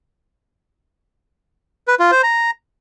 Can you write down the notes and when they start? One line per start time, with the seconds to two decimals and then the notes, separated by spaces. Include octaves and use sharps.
1.88 B4
2.00 F4
2.11 C5
2.23 A#5